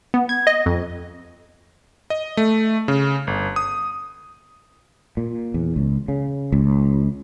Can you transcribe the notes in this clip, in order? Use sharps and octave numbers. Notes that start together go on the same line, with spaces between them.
B3
G#6
D#5
F2
D#5
A3
C#3
G1
D#6
A#2
E2
C#2
C#3
C#2